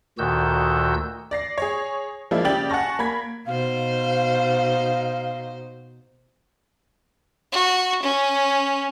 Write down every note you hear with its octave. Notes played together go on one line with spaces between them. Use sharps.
D2 A#2 D#3 F#4 E6 G6
D5 A#6 C7
G#4 C#5
F3 G#3 A#3 D4 E4 F4
C#3 G4 D5 G5 A6 F#7
F#5 G#5 A5 C#6 A#6
A#3 B5 G#6 B6
B2 D#4 C5 F5
F#4
C#4